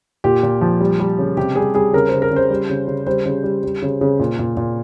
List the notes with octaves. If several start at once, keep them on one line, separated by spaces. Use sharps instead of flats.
A#2 G4
A#2
F3
G3
G3
C#3
C3 G4
G3 G#4
G3 G#4
C#3 A#4
C#3 C5
A#4
C#3
C5
G3
C#3
C#3
G3 C5
C#3
G3
G3
C#3
C#3
A#2
A#2
A#2